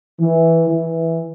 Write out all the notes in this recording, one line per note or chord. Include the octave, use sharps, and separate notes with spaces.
E3
E3